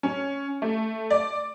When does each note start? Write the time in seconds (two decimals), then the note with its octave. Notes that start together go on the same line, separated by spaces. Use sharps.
0.03 C#4
0.62 A3
1.10 D5